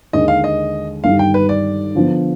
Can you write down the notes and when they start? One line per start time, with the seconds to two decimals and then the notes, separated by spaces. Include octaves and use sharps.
0.13 D#2 D3 G#3 D#5
0.28 F5
0.44 D#5
1.04 G1 G2 D#3 G3 F5
1.19 G5
1.34 B4
1.49 D5
1.95 D3 F3 B3